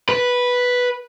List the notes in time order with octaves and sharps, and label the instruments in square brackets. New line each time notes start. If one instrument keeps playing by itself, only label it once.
[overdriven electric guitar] B4